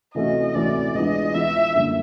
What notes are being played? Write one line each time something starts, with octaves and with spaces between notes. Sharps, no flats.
C3 E3 A3 C#4 F#4 D#5
C3 E3 A3 C#4 F#4 D5
E3 G#3 B3 D4 F4 D#5
E3 G#3 B3 D4 F4 E5
F#2 D3 G3 A#3